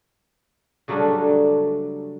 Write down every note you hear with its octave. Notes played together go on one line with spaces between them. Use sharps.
C#3 F#3 G3 A3 C#4 D4